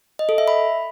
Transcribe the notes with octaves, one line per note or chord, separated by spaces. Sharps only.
D#5
A4
E5
B5